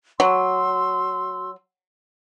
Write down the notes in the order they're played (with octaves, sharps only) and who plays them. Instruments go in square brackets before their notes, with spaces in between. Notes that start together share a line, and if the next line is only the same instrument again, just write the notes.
[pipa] F#3 [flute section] F#4 C6 E6